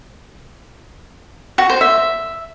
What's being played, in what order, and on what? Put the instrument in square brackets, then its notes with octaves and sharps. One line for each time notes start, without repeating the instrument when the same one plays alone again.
[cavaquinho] F#4
C5
E5